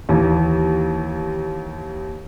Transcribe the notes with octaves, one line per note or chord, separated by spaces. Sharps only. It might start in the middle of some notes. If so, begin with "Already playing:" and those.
D#2 E3